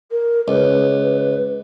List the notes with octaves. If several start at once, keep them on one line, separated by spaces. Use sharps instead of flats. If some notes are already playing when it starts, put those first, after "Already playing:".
A#4
C#2 B4